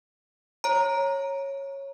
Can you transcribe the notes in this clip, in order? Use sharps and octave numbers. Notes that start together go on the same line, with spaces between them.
C#5 A#5